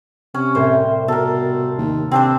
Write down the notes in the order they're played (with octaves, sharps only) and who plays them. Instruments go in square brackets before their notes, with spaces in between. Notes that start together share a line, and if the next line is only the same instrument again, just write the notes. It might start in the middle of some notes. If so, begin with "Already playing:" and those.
[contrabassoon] C3 [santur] C#4
[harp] C2 A2 A#3 [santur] C5
[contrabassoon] B2 [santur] A4 A#4
[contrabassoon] D#2
[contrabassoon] C3 [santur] C4 D4 C5